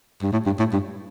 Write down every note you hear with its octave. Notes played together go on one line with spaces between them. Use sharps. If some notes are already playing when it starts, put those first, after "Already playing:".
G2
A2
G2
A2
G2